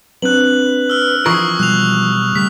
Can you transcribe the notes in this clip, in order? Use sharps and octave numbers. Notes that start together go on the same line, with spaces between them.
F#3 C4 D4 B4 F#6 F#7
E6 F6
E3 F3 A#4 C#6 D#6 G#6 C7
B2 F#3 G3 F#6 F7
C#3 G3 A3 B6